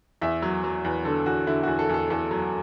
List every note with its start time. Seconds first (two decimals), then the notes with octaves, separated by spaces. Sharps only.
0.22 E2 E5
0.42 F#3
0.64 F#3
0.85 E2 B4
1.05 D3 A4
1.26 E2 F#4
1.47 D3 E4
1.63 E2 F#4
1.79 A4
1.89 E2 A4
2.10 E2 A4
2.31 F#3